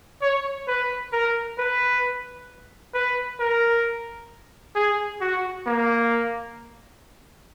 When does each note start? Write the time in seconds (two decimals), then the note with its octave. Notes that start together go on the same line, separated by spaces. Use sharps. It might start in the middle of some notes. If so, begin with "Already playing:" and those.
0.22 C#5
0.68 B4
1.12 A#4
1.58 B4
2.95 B4
3.40 A#4
4.76 G#4
5.21 F#4
5.67 A#3